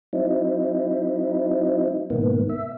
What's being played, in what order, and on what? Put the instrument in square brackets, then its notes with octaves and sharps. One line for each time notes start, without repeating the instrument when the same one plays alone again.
[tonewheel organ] F#3 C4 D#4 E4
G#2 B2 D#3 A#3 B3
E5